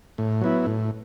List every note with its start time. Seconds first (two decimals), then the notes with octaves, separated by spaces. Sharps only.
0.18 A2
0.41 F#3 B3 E4
0.66 A2